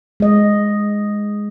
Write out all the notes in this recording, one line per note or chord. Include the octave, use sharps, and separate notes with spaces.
G#3 D#5